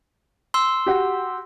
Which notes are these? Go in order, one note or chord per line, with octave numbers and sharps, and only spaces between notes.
C6 E6
F#4 G4